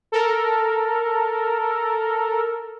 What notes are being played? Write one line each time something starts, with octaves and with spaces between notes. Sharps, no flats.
A4 A#4